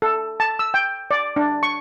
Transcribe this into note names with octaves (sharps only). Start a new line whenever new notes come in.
A4
A5
E6
G5
D5
D4
C#6